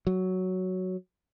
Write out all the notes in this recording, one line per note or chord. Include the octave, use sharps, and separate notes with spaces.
F#3